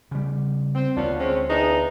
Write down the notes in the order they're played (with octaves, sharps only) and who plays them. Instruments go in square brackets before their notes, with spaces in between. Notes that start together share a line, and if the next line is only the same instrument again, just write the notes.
[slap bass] C#3 G3
[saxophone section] C4
[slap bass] D2 [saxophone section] B3 C#4 F4 [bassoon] D4
[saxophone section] G#3 C#4 [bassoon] C4
[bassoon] E2 [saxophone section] D4 D#4